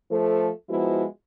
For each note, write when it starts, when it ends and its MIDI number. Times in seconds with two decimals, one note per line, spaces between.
0.11 0.50 53
0.11 0.50 57
0.11 0.50 69
0.69 1.05 53
0.69 1.05 56
0.69 1.05 59
0.69 1.05 64
0.69 1.05 66